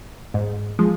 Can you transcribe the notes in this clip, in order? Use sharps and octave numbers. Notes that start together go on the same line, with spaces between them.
G#2
F3 G#3